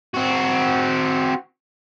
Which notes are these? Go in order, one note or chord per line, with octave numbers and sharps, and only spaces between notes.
C4 F#4